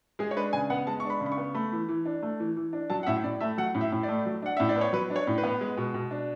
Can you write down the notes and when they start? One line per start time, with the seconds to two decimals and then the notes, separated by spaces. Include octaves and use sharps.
0.19 G#3 G#4
0.31 C#5
0.36 D4 B4
0.53 C#3 G#5
0.70 B3 F#5
0.87 G#3 A5
1.00 D4 C#6
1.10 B5
1.21 C#3
1.26 B5
1.32 C#6
1.37 B3
1.54 A3 B5
1.72 E3
1.88 E3
2.05 D4
2.23 A3
2.40 E3
2.57 E3
2.73 D4
2.90 F#3 A5
3.03 F#5
3.07 A2 E5
3.24 A2 D5
3.41 A3 E5
3.58 F#3 F#5
3.75 A2
3.81 E5
3.92 A2
4.03 D5
4.08 A3
4.26 F#3
4.42 D4 F#5
4.57 A2 E5
4.69 D5
4.76 B3
4.81 C#5
4.93 F#3 B4
5.10 D4
5.16 C#5
5.27 A2
5.38 B4
5.44 B3
5.61 G#3
5.77 B2
5.94 B2
6.11 D4